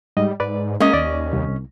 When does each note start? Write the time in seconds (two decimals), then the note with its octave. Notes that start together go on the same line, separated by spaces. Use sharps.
0.17 G#2 G3 D#5
0.40 G#2 B4 D5
0.80 G#3 A#3 C#4 D#5
0.93 D#2 D5
1.33 C2